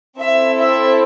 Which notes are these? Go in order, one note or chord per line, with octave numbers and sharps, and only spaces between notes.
C4 E4 A4 E5
E5